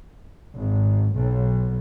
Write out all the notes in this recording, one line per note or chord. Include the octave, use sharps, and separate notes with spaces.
G#1
B1